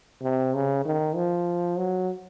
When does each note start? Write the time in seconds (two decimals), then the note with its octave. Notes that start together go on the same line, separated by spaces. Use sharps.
0.22 C3
0.54 C#3
0.85 D#3
1.16 F3
1.78 F#3